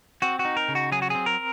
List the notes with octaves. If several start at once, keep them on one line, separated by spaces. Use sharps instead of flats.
C4 F#4
F#4
D#4
A#4
C#3
F#4
F#3 G#4
F#4
C4 G#4
A#4